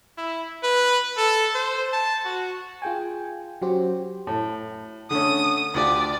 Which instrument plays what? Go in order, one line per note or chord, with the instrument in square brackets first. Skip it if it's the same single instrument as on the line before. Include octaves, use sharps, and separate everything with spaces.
[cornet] E4
B4
A4
C5
A5
F#4
[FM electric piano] F4 G#4 G5 G#5
F#3 C#4 F#4 G4 C5
[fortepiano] A2
[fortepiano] D3 A3 C#4 [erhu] D#6
[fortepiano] D2 F4 G4 [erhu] D5